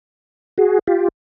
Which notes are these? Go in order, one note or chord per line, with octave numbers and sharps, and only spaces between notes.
F#4 G#4
F4 G4